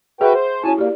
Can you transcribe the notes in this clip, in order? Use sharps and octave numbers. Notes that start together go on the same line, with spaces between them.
F#4 G#4 B4 E5 F#5 G5
C5
C#4 E4 F#4 C#5 G#5 A5
A#3 G4 D5